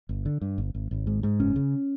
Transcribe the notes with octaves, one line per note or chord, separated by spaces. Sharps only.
G1
D3
G2
G1
G#1
G#1
G#2
G#2
F#1 C#4
C#3